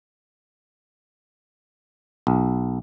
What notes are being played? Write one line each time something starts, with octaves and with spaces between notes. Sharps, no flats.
B1